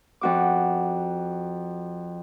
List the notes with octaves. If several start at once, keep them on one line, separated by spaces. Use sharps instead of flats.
F2 F#4 D6